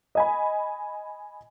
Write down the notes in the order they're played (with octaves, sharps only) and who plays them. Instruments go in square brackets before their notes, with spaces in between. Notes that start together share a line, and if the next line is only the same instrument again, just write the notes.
[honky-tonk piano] D#5 G#5 B5